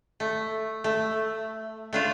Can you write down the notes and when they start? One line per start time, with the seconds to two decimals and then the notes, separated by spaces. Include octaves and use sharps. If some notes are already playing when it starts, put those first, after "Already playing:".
0.20 A3
0.84 A3
1.93 A3 D4 F4